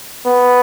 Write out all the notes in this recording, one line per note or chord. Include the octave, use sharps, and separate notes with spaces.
B3